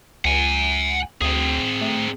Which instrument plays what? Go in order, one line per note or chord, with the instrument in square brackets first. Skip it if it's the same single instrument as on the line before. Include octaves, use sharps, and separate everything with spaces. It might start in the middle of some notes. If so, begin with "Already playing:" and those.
[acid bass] C#2 [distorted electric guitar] F#5 G#5
[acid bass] D2 [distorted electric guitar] C4 G#4
[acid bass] A3